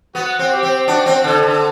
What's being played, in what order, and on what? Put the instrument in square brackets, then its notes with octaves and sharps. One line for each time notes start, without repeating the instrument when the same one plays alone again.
[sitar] B3 [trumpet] F#4
[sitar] C4
[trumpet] G4
[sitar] C4
[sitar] D4 [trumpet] F#4
[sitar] C4
[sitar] D3 [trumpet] A4
[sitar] D3